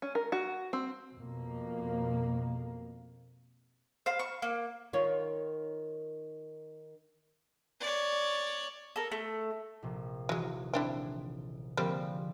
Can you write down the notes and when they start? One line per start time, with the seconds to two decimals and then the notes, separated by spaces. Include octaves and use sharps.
0.02 C#4
0.15 A#4
0.32 F#4
0.73 C4
1.15 F2 B2 A#3
4.06 C5 F5
4.19 C#6
4.42 A#3
4.93 D#3 F4 C#5
7.81 C#5 D5
8.96 A4 A#4
9.12 A3
9.82 A#1 C3
10.29 D#1 E3 F#3 G#3 D#7
10.74 C4 D4 E4
11.77 D3 F3 G3 G#3 A#3 C4